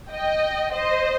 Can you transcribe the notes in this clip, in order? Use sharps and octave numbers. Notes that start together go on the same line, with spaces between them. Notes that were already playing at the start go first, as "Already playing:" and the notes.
D#5 G5
C5 D#5